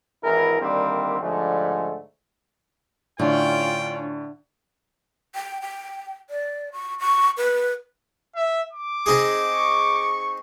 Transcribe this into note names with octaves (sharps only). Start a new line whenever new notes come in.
G#1 E3 E4 G#4 A#4
D3 D#3 G3 A#3 C4
G#2 D3 F3 G3 A3
A2 D3 C#4 D4 F4 G5
G5
G5
D5
C#6
C#6
B4
E5
D6
C4 D#4 G#4
C#6